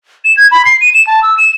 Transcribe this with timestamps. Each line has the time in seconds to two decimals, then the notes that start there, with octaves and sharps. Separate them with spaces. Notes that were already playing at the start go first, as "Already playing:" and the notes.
0.24 E7
0.37 G#6
0.51 B5
0.65 C7
0.81 D#7
0.94 E7
1.07 A5
1.23 E6
1.38 E7